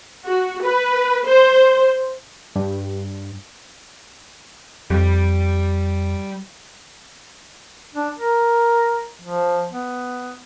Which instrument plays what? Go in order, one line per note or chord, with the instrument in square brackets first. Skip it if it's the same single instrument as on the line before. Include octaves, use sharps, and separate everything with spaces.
[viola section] F#4
B4
C5
[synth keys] G2
[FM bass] F2 [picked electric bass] G3
[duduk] D4
A#4
F3
B3